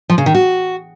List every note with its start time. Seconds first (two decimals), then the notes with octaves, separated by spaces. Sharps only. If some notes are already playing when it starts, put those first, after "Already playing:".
0.10 F3
0.18 C#3
0.26 D#3
0.35 F#4